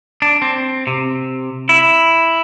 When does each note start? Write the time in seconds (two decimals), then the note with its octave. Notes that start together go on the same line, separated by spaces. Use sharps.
0.22 D4
0.42 C4
0.87 C3
1.69 E4